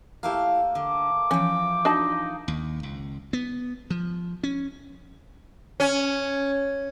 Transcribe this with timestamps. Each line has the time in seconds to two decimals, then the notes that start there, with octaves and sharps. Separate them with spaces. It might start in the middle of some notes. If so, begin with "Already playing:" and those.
0.23 A3 A#3 E4 G4 F5
0.75 D3 D6
1.31 E3 F3 C#4 G5
1.85 D4 D#4 F#4 D#5 A5
2.48 D#2
2.83 C#2
3.33 B3
3.90 F3
4.43 C#4
5.80 C#4